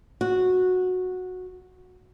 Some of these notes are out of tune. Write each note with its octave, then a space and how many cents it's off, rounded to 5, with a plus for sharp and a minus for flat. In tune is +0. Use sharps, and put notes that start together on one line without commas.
F#4 -10